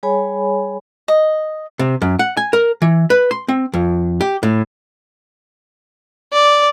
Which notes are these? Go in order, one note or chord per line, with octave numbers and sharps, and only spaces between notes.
G3 G#4 C#5 G#5 B5
D#5
C3
F#2
F#5
G#5
A#4
E3
B4
C6
C4
F2
G4
A2
D5